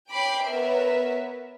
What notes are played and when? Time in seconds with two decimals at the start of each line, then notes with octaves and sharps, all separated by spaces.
0.12 C#5 G5 B5 D6 C7 D7
0.48 B3 A#4 B4 C#5 E5